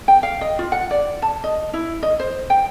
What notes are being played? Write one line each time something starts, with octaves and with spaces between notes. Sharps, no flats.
G5
F5
D#5
F4
F#5
D5
A5
D#5
E4
D#5
C5
G5